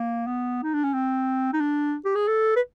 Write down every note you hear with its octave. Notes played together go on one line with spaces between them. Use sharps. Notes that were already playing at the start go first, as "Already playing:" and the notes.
Already playing: A#3
B3
D#4
D4
C#4
C4
D#4
D4
G4
G#4
A4
B4